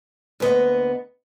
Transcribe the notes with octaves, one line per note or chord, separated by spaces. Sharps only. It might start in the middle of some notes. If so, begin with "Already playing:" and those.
D2 A#3 B3 D#5